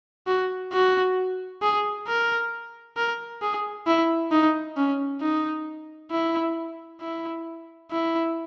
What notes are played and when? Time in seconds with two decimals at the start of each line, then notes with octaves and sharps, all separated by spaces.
0.27 F#4
0.72 F#4
1.62 G#4
2.07 A#4
2.97 A#4
3.41 G#4
3.86 E4
4.31 D#4
4.76 C#4
5.21 D#4
6.11 E4
7.01 E4
7.91 E4